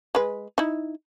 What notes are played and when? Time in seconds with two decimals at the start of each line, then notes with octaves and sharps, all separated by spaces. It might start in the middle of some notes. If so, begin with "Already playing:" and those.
0.15 G#3 B4
0.58 D#4 E4